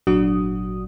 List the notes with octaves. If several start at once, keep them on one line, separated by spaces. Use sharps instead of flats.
G#1 A#2 F#3 D4 F#4 D#6